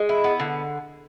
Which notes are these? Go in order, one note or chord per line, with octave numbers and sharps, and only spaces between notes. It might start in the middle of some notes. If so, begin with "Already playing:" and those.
Already playing: G#3
E4
B3
D3